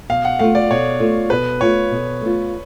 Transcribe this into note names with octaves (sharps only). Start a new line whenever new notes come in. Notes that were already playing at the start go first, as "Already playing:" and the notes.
B2 F5
F#5
A3 F4 F5
D5
B2 C#5
A3 F4
B2 B4
A3 F4 C#5
B2
A3 F4